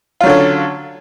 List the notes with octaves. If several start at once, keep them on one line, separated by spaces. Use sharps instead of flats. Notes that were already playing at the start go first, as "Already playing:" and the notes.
D3 F#3 C#4 F4